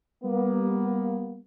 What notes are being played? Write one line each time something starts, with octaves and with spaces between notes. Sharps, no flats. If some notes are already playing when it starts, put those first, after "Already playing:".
G3 A#3 B3